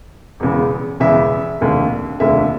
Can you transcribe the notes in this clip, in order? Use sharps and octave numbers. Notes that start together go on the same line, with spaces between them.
E1 E2 C#3
E1 E2 C#3 E5
F1 D#2 D3
F1 D#2 D3 E5